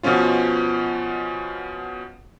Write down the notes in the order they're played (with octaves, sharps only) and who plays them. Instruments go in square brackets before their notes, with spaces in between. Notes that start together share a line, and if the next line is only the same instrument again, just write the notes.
[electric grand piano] B2 F3 B3 C#4 F4